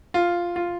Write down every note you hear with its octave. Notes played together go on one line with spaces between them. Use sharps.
F4
F4